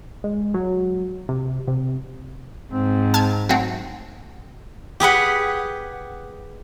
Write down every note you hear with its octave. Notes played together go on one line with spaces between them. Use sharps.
G#3
F#3
C3
C3
G#2 C4
A5 F6 G#6
F#3 A3 C4
G4 G#4 B4 F#5